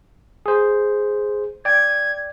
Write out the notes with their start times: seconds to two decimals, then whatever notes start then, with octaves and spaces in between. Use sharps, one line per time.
0.46 G#4 C5
1.65 D5 G5 G#6